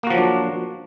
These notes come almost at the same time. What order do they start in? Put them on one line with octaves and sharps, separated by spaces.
A#3 F#4 F3 F#3 D4